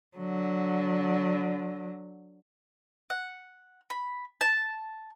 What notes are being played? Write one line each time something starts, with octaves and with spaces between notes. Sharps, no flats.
D3 F#3
F#5
B5
A5